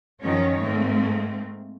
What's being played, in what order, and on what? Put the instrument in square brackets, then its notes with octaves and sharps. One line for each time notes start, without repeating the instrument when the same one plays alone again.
[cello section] F#2 D#3 F3 F#3 C#4 C#5
G#2 A3 A#3 C4